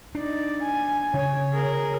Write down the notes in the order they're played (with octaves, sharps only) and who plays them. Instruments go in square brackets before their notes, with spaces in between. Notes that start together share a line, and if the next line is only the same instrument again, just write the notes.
[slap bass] D4 [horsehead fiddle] D#4 D5
[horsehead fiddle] G#5
[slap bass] C#3 [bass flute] C#5
[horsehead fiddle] G#4 A#4